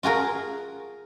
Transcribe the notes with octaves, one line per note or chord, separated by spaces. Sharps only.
F4 F#4 G#4 A#4